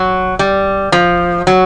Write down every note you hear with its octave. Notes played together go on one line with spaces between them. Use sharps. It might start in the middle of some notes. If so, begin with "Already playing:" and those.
Already playing: F#3
G3
F3
F#3